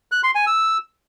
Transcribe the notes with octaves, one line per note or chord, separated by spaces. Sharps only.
F#6
C6
G#5
E6